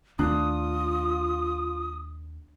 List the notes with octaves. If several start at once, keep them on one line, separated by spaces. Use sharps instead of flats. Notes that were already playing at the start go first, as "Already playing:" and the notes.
D#2 D#3 A3 D4 F4 D#6